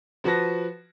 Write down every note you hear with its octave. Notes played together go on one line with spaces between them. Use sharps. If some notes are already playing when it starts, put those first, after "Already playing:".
F3 F#4 B4 A5 A#6